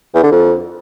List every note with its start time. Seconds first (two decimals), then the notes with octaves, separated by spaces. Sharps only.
0.14 E2
0.23 D3
0.32 F2